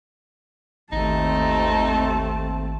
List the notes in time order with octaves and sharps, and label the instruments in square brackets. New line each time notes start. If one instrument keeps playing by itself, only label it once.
[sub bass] G#1 [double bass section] D#2 C4 [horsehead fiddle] A3 A5 [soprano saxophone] D#4